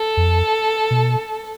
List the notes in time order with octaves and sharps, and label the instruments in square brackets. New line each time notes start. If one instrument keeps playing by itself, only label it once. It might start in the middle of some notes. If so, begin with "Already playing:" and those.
Already playing: [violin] A4
[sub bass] F2
B2